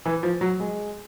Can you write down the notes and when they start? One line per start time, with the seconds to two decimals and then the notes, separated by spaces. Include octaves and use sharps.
0.06 E3
0.23 F3
0.41 F#3
0.60 G#3